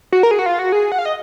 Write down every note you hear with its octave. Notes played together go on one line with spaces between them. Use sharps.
F#4
A#4
G#4
F#4
F4
F#4
G#4
F#5
F5
D#5